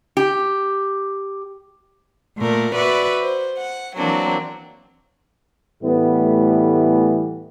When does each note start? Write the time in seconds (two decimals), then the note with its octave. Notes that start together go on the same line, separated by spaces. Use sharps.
0.17 G4
2.37 A#2 A3 A#4
2.74 F#4 B4 D5 E5
3.22 C5
3.58 F#5
3.96 E3 F#3 A#3 C4 D4
5.83 A2 E3 G3 A3 B3